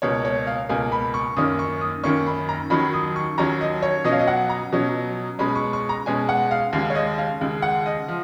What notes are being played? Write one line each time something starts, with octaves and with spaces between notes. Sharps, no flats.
C#2 B2 A#3 C#5
C#5
F5
C#2 B2 A#3 G#5
B5
C#6
F#2 D#3 A#3 C#4 D#6
C#6
D#6
F#2 D#3 A#3 C#4 C#6
B5
A#5
D#2 D#3 F#3 C#4 B5
D#6
C#6
D#2 D#3 F#3 C#4 A#5
D#5
C#5
B2 F#3 C#4 D#5
F5
D#5
F#5
A#5
B2 F#3 C#4
B2 G#3 C#4 B5
C#6
C#6
A#5
B2 G#3 C#4 G#5
F#5
F5
D#2 C#3 G#3 F5
C#5
D#5
F5
D#2 C#3 G#3
F#5
D#5
F3